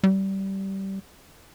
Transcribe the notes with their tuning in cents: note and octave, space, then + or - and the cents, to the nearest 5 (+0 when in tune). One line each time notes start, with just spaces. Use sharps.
G3 -20